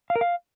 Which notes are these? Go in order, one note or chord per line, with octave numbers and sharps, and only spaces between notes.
F5
A#4
F5